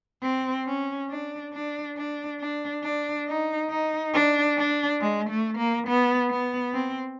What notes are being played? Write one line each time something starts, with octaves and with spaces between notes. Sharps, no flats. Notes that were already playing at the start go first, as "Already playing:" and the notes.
C4
C#4
D4
D4
D4
D4
D4
D#4
D#4
D4
D4
G#3
A3
A#3
B3
B3
C4